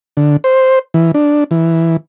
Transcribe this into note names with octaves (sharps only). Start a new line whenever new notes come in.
D3
C5
E3
D4
E3